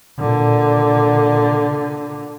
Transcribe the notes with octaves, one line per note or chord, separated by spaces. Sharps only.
A#2 D3